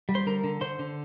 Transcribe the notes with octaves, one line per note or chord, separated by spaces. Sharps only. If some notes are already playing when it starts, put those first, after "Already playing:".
G3
C5 C6
D3 A#4 A#5
D3
D3 C5 C6
D3